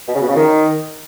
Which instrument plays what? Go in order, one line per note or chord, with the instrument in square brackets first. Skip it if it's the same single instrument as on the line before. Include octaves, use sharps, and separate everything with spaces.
[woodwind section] B2
C#3
B2
C#3
D#3